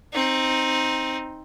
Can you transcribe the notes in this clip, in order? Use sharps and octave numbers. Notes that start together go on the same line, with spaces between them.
C4 D#4